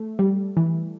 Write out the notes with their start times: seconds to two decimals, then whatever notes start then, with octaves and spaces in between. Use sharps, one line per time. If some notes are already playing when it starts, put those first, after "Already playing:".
Already playing: A3
0.19 G3
0.57 E3